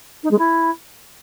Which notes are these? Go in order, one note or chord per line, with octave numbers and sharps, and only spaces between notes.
D#4
G#3
E4